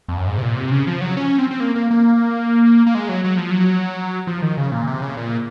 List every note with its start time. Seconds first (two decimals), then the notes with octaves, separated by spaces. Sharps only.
0.08 F2
0.17 F#2
0.27 G#2
0.38 C3
0.42 A#2
0.56 C3
0.71 C#3
0.87 F3
1.01 F#3
1.17 C#4
1.38 C4
1.51 C4
1.60 A#3
1.76 A#3
1.91 A#3
2.86 A#3
2.95 G#3
3.09 F#3
3.24 F#3
3.37 F3
3.51 F#3
4.27 F3
4.42 D#3
4.57 C#3
4.72 A#2
4.87 C3
5.02 C#3
5.17 A#2